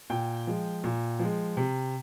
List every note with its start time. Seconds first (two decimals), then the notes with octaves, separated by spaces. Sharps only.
0.10 A#2 G5
0.47 F3 G#3
0.84 A#2
1.19 F3 G#3
1.57 C3